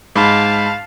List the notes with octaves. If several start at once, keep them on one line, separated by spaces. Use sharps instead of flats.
G#2 F5 A5 B5